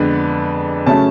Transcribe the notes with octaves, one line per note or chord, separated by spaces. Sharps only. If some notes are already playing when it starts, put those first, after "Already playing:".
Already playing: F2 D3 G#3 B3 D4 B4
C#3 F#3 A3 C#4 A5